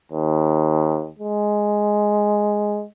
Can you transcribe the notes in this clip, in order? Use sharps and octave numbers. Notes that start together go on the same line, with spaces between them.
D#2
G#3